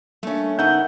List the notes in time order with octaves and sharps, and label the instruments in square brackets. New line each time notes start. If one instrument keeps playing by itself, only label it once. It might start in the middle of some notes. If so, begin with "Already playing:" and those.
[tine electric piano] G3 A#3 D4 [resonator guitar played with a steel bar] A3 C#4
[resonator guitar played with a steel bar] C#3 B3 E5 [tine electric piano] C#4 D#4 A#4 [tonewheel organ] F#5 G6